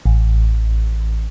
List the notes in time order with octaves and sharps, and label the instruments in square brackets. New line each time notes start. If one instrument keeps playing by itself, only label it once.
[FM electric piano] A1